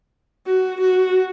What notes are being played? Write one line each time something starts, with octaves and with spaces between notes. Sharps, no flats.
F#4
F#4